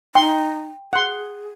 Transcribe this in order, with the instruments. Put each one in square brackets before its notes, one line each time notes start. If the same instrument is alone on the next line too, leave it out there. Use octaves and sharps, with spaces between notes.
[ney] D#4 [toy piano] G5 [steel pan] C6
[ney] G#4 [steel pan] F#5 C6